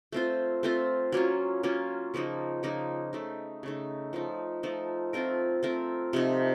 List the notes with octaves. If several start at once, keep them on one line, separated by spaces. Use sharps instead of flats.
A3 C4 F4 C5
A3 C4 F4 C5
F#3 A#3 C#4 F4
F#3 A#3 C#4 F4
C#3 F3 A#3 D#4
C#3 F3 A#3 D#4
C#3 A3 D#4
C#3 A3 D#4
F3 A3 D#4
F3 A3 D#4
A3 C4 F4 A#4
A3 C4 F4 A#4
C3 F3 A3 D#4